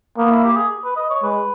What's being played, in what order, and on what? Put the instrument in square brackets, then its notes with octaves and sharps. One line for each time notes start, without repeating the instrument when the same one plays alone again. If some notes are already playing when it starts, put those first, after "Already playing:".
[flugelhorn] A#3 [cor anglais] B3
[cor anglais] E4
G4
G#4
B4
D#5
C#5
[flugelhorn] G#3 [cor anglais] B4